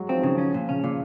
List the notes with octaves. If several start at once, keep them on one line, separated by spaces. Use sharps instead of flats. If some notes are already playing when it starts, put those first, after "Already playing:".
Already playing: F#3 G#3
F3 C4
D#3
C#3 F3
C#4
A#2
C#3 C#4
A#2 C#3